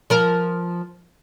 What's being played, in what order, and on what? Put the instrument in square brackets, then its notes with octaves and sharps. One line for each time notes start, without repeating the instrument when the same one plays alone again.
[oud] F3 A#4